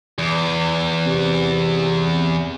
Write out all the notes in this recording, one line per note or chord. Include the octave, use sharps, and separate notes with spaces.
E2
C3